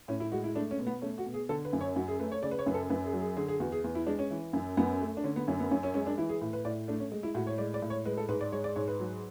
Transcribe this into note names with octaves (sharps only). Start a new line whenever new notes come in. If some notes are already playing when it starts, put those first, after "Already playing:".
A2 C#4
E4
G#3 F#4
E4
A3 D4
C#4
B2
B3
A3 C#4
F#4
B2
G#4
D3 A4
B4
F#2
C#5
F#2 F#4
G#4
A3 B4
C#5
C#3 D5
B4
C#5
F#2 B4
A4
F#2 B4
G#4
F#3
G#4
D3 G#4
G#4
E2 F#4
G#4
E2
E4
G#3 D4
C#4
E3
F#2
F#2 B3
A3
D4
D3 C#4
B3
F#2 C#4
B3
F#2 C#4
C#4
G#3 C#4
D4
E3 E4
G#4
A2
B4
A2 D5
A3 D4
C#4
G#3
E4
A2 F#4
C#5
G#3 D5
D5
A2
C#5
G#3 B4
A4
G#2 B4
D5
G#3 C#5
D5
G#2 C#5
B4
F#3